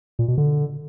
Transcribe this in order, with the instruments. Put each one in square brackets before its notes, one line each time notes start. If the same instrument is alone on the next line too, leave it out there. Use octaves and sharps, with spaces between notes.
[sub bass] A#2
B2
D3